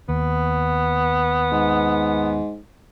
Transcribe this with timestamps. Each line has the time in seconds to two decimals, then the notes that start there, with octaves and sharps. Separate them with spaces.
0.09 D#2 B3
1.52 G#2